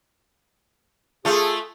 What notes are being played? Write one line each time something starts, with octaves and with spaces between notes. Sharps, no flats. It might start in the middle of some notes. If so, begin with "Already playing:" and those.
A3 F4 G#4 A4